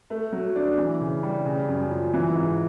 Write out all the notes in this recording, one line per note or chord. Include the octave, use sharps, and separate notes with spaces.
A3
F#3
D4
E3
C#3
G3
C#3
F#2
F3
E3
G#2